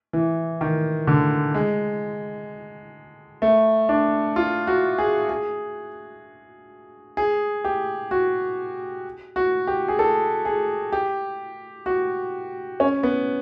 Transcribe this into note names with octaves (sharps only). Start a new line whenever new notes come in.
E3
D#3
D3
G#3
A3
D4
F4
F#4
G#4
G#4
G#4
G4
F#4
F#4
G4
G#4
A4
G#4
G4
F#4
C#4
B3